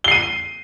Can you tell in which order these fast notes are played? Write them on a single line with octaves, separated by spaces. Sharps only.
G7 C7 D#7